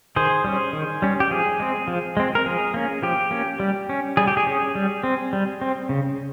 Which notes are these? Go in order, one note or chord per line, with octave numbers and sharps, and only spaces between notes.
D#3 G#4 C5
G3 C#4
D#3
G3 C#4
G4
F3 G#4
G#3 C4
F3
G#3 C4
A#4
F3 G#4
A#3 C#4
F3 G4
A#3 C#4
G3
C#4
G3 G#4
G4
G#4
C#4
G3
C4
G3
C4
C#3